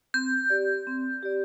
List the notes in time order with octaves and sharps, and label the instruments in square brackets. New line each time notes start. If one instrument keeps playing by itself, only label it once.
[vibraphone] C4 [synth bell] G6
[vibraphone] G4 D5
C4
G4 D5